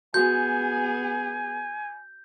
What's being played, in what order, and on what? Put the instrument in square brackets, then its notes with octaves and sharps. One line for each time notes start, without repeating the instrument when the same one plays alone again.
[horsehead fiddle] B3 G#4 [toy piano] F#4 D#6 [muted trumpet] G#5 [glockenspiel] G6